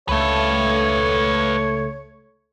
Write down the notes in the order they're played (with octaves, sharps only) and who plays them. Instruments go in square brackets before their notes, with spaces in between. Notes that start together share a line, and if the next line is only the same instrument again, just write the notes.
[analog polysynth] C#2 A3 [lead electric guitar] B4 F5 [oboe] C#5